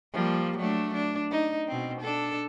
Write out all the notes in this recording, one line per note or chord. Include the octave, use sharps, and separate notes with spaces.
F3 G3 A#3
F#3 A3 D4
D4
D#4
B2 C4
D4 A4